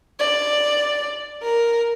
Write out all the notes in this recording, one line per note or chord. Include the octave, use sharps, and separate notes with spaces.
D5
A#4